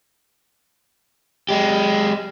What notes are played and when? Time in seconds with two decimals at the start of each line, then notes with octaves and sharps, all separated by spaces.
1.49 G#3 G4